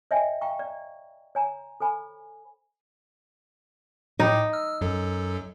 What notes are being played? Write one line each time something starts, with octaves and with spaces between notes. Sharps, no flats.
C#5 D#5 E5 G5 G#5
F5 G5 A#5 C#6
D5
C#5 G#5 A#5
A4 C5 G#5 B5
A2 D#4 G5 D6
E6 F6
F#2 F#3 A4